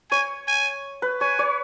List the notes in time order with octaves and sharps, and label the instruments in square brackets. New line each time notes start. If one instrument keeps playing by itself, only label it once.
[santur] C#5 [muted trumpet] G#5
[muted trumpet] G#5
[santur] B4
[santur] C#5 [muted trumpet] G#5
[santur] C#5